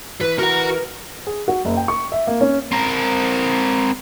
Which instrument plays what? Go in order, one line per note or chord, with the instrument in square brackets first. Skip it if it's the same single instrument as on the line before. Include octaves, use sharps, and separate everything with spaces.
[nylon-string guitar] E3 [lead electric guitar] B4
[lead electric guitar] F#4 F#5 [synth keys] A#4
[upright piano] G#4
F#4
F#1
G5
C#6
E5
A#3
C#4
[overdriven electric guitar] C4 A#4